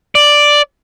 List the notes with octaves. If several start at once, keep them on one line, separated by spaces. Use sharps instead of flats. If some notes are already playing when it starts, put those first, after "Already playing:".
D5